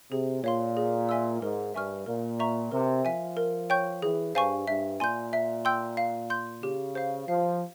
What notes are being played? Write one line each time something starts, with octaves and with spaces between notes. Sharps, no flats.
C3 G#4
A#2 C#5 F5 C6
G#4
E5 G#5 C6 E6
G#2 A#4
G2 E5 G#5 C#6 F6
A#2 A#4
E5 A#5 C#6
C3 A#4
F3 E5 G#5
A#4
C#5 G5 C#6 G6
E3 G#4
G2 C5 F5 G#5 C#6
G2 E5
A#2 G#5 C6 G6
E5
G5 C6 E6 G6
F5
C6 G6
C#3 G4
C5 F5
F3 F5